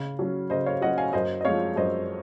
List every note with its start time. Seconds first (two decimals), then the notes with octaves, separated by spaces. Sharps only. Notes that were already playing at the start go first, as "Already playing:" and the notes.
Already playing: C#3
0.19 F#3 C#4
0.50 C#3 C5 D#5
0.66 C#5 F5
0.81 F#3 C#4 D#5 F#5
0.98 F5 G#5
1.13 F#2 C5 D#5
1.41 D#5
1.44 F3 G#3 C4 C#5 F5
1.76 F#2 C5 D#5